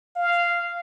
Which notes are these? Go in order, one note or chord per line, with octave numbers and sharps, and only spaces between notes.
F5